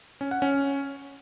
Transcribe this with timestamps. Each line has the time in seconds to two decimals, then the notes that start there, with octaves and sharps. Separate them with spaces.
0.21 C#4
0.31 F#5
0.42 C#4